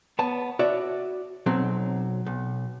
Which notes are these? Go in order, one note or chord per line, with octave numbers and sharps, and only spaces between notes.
B3 C#5 A5
F#4 C#5 D5 E5
B1 F#3 C4
B1